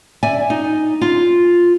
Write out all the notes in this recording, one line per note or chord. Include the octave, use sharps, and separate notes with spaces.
D5 E5 G#5
D#4
F4